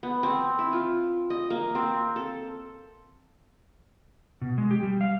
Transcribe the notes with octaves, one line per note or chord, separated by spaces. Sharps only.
B3
C4
E4
F4
D#5
A#3
C4
A4
B2
G#3
G4
G3
F5